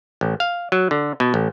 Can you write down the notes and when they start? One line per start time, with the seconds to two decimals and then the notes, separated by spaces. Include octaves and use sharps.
0.21 A1
0.40 F5
0.72 F#3
0.91 D3
1.20 B2
1.34 A1